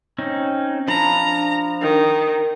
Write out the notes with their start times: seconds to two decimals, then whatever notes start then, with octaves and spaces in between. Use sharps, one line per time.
0.18 C4 C#4 D#4
0.88 F3 D4 A#5 B5
1.81 D#3